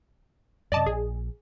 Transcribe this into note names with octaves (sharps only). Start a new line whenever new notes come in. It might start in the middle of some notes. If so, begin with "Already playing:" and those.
F#2 C3 D5 D#5 A5
A#1 G#4